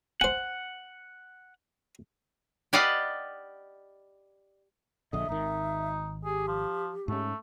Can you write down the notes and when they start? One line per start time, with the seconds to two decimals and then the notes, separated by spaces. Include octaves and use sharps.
0.21 C5 F#5 G#5
2.73 G4 B4 D5 D#5 F5 F#5
5.13 A#1 D3 D#5 E5
5.29 G#1 D#3 D#4
6.24 G4 G#4
6.47 F3
7.08 G#2 A3 C#4